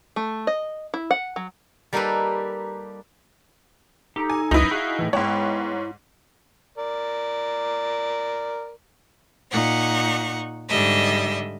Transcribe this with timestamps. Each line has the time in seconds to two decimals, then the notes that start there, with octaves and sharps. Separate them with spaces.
0.16 A3
0.47 D#5
0.94 E4
1.11 F#5
1.36 F#3
1.93 G3 A#3 D#4 G4 A4 B4
4.16 D#4 G4 A4 A#5
4.30 G#5
4.51 C#2 F#2 D#4 E4 B4 D#5
4.71 F#4 G#4 F5
4.99 A2 E3
5.13 G#2 G#3 B3 E4 C#5 G5
6.78 A#4 D5
9.51 A#2 D#4 F#5 C#6
10.68 G#2 D3 G3 D#5 E5